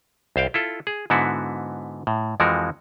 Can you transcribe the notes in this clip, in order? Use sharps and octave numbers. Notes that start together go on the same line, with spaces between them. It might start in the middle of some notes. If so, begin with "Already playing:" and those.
C2 C5 F5 G5
E4 F4 A4
G#4
G#2 D3 B3 E4 F#4
A2
F2 E3 F3 G#3 F#4 A#4